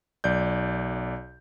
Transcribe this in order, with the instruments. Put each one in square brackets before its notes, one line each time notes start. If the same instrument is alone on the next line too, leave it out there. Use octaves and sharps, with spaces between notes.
[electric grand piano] B1 D5 G6